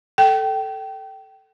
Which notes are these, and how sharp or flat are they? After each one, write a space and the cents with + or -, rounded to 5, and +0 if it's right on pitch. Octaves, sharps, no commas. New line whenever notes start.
A4 +0 G5 -20